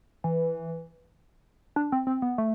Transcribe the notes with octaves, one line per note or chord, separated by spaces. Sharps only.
E3
D4
C4
C4
B3
A3